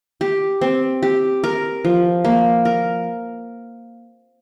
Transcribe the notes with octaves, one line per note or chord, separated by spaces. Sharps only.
G4
C4
G4
A#4
F3
A#3
A#4